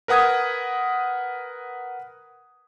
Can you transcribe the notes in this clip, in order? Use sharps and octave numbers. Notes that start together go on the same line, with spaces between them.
A#4 B4 F#5 D#6 G#6